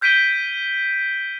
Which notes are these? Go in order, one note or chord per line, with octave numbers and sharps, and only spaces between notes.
F6 G6 B6 D7 D#7 G7